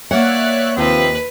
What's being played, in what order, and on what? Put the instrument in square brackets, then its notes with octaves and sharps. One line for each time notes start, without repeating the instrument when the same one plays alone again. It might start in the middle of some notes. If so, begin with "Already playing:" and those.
[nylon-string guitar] A#3 F#5 [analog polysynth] C#5 E5 F#6 [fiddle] D5
[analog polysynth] D#2 [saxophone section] C3 F3 C4 [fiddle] B4